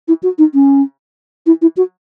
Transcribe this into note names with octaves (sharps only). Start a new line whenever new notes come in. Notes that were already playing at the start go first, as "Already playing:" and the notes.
E4
F#4
D#4
C#4
E4
E4
F#4